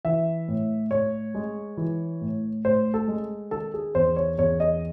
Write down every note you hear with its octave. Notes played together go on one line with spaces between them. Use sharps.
E3 E5
A2
A2 C#5
G#3
E3
A2
A2 C5
A4
G#3
D#3 A4
G#4
E2 C5
C#5
E2 C#5
D#5